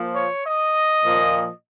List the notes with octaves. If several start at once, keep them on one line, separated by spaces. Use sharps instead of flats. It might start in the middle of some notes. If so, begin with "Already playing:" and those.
Already playing: A#2 F3
C#5
D#5
A#2 F3